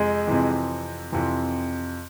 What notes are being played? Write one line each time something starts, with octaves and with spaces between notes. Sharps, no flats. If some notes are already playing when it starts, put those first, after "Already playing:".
Already playing: F2 C3 G#3
F2 C3 E3
F2 C3 E3